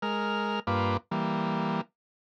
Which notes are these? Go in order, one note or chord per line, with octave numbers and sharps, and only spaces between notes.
G#3 A#4 F6
G2 A#3 F4 B4 D6
E3 G3 A#3